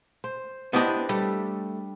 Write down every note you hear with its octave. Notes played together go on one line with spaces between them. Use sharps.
C5
B3 D4 E4 G4 C5 D#5
G3 A3